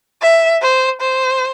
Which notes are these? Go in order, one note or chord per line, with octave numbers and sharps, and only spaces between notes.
E5
C5
C5